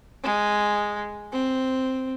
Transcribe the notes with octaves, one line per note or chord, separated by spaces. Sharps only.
G#3
C4